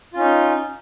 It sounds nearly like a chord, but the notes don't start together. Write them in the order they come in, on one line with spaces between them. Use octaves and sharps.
F4 C#4 D#4